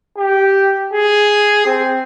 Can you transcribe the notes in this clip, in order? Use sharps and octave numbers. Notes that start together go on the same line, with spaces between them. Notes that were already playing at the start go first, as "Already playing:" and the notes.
G4
G#4
C4